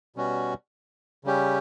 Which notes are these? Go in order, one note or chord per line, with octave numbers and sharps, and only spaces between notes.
B2 G3 C#4 F#4
C#3 G3 C#4 G4